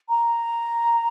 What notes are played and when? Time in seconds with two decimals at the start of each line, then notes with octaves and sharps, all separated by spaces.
0.09 A#5